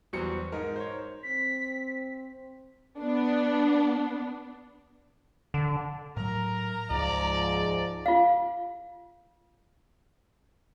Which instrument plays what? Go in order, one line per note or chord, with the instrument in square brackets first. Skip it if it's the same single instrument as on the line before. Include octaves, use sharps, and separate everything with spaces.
[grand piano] E2 F#3 G3 F#4 C5 C#7
G#2 D#4 A#4
C5 C#5
[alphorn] C4 [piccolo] B6
[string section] B3 D4
[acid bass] D3
[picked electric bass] A2 F#3 [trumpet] A#4 [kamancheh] A#5
[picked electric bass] C#2 [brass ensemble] G#2 F3 [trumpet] D5
[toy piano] F4 F5